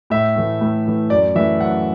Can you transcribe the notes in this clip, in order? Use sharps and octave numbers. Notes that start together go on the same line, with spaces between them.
A2 E5
E3 A3
A2
E3 A3
F#2 D5
E3 A3 E5
F#2 F#5